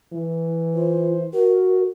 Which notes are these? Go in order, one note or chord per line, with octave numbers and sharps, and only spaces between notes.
E3
F4 C5
F#4 A#4